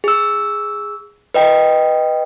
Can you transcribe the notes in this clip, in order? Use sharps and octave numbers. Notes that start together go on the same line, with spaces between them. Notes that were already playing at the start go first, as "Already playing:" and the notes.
G#4 E6
B4 D#5 G5